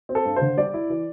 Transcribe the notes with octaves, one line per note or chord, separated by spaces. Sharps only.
C4
A4
G2
D3 C5
G3 D5
E4
E3